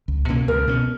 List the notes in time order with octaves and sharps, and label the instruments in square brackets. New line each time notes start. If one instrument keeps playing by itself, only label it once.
[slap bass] C#2
B2 A#3 C#4
[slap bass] C#2 [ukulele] A#4
[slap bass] B2 A#3 C#4